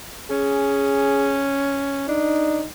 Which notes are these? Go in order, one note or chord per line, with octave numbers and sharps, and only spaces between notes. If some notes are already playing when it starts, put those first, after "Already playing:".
C#4 G#4
D4 D#4